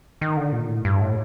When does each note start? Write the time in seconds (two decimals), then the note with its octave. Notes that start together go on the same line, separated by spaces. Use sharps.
0.21 D#3
0.37 D3
0.52 A#2
0.69 A2
0.85 G2
1.01 A2